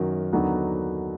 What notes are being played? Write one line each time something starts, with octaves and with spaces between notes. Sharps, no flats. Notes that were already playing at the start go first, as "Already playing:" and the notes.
Already playing: F#2 D#3 F#3
D#2 D3 F#3 B3 D#4